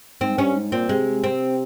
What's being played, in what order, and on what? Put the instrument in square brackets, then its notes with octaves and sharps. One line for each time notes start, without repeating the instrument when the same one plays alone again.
[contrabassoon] G#2 [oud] C4
[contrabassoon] G2 [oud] C#4
[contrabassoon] G#2
[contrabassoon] A#2 [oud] C4
[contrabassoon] C3 [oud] G#3
[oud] C4